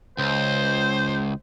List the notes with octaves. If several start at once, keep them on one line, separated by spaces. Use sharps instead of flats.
C#2 C5